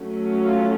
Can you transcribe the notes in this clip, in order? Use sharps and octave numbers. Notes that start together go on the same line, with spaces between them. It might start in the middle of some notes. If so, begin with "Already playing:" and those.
Already playing: F#3 A3 C#4
F4